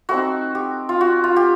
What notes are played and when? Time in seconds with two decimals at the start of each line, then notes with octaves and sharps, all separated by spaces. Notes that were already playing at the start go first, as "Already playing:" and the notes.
0.09 A3 C4 D#4 F#4
0.55 G4
0.89 F4
1.01 F#4
1.24 F4
1.36 G4